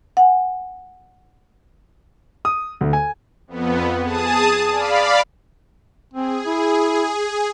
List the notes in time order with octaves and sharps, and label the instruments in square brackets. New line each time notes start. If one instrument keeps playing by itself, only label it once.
[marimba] F#5 G#5
[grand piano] D#6
D2
G#5
[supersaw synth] F2 B3
G#4 A5 D#6
D5 F5 B5
[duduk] C4 [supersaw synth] G#4
[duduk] E4